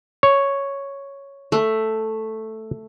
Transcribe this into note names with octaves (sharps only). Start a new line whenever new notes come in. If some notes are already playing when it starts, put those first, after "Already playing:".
C#5
A3